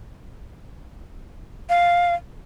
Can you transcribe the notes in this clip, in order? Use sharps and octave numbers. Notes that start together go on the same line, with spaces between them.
F5